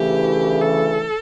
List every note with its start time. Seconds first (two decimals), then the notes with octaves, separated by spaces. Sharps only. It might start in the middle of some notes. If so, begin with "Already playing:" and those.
Already playing: D2 C#3 E3 A3 G4
0.61 A4